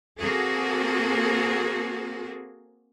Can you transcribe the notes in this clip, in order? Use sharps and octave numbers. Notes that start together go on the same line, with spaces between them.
A#3 C4 F#4 G#4 A4